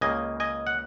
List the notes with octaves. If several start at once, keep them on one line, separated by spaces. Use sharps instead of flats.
C#2 C#3 A#3 D#5 G#5
D#5 G#5
F#5